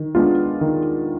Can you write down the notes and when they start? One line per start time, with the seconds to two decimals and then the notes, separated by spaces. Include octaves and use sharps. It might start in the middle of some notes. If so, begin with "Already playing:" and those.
Already playing: D#3
0.15 G#3 B3 D4 F4
0.61 D#3